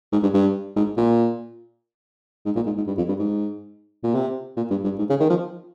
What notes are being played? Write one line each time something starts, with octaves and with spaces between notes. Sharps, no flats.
G#2
G2
G2
G#2
A#2
G#2
A#2
G#2
G#2
G2
F2
G2
G#2
A#2
C3
A#2
G2
G2
G#2
C#3
D#3
F3